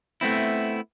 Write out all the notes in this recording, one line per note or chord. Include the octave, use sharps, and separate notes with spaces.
A3 B3 C4 E4